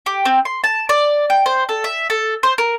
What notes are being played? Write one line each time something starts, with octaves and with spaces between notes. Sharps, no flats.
G4
C4
C6
A5
D5
G5
C5
A4
E5
A4
C5
A#4